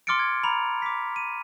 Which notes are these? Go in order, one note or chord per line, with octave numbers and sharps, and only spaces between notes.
C6 D6 F6 A6 C#7 D7
G#6
A#5 B5 F7
D6 B6
D#7